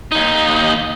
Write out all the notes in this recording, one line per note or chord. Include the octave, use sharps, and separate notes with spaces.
D#2 D#4